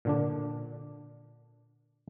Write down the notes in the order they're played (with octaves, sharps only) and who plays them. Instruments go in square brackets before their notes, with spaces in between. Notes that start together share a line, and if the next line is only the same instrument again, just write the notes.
[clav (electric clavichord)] A#2 D3 D4